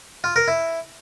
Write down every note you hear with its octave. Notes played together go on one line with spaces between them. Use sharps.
F4
A#4
E4